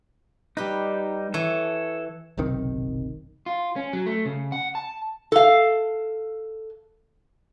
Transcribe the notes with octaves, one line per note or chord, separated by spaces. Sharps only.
G3 D#4 G4 B4
E3 A4 C#5
F#1 B1 C3 D#3
F4
C#4
F#3
A3
C#3
F#5
A5
A4 F5